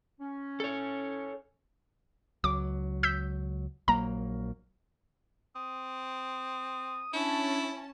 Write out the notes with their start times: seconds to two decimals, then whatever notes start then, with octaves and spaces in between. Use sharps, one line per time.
0.20 C#4
0.60 A4 C#5
2.44 C#2 F#3 D6
3.03 E6 G6 B6
3.88 A#1 F#3 A#3 A#5
5.56 C4 D#6
7.14 C#4 D4 E4 A5